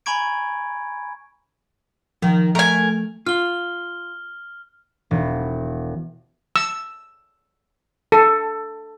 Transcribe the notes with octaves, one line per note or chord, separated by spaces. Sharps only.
G#5 A#5 B5 C#6 G#6 D7
D#3 F3
A3 A#4 G#5
F4 F6 G7
E1
E6
A4